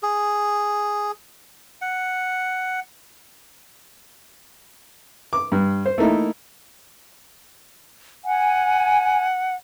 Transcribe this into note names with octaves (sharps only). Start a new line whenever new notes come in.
G#4
F#5
D6
G2
C5
A3 A#3 D#4 E4
F#5 G#5